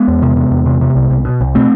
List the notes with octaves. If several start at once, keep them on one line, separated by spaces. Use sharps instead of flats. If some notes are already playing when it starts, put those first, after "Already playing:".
Already playing: G#3 B3
E2
C3
C3
E2
C3
C3
C2
C2
B2
C2
B2 A3 C4